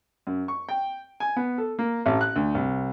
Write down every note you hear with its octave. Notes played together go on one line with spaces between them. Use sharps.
F#2
C#6
G5
G#5
B3
A4
A#3
A1
F#6
D2
C2